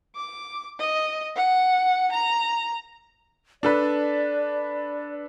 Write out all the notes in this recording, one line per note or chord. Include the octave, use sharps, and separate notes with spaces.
D6
D#5
F#5
A#5
D4 A4 B4 D5